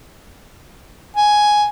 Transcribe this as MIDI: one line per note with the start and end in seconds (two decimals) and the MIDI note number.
1.17 1.69 80